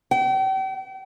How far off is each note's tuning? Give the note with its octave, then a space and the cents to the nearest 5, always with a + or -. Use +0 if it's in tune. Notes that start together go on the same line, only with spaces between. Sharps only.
G5 -40